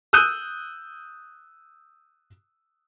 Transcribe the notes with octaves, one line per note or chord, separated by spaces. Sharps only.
D#6 E6 F#6 G6 D#7